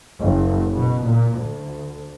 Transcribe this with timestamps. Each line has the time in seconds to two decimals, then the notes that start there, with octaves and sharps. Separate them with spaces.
0.19 F#1
0.74 B2
1.04 A#2
1.39 D2